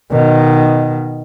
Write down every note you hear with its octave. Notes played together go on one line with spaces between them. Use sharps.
B2 D#3